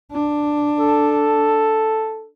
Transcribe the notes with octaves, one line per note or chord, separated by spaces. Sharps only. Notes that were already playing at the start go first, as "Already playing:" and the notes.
D4
A4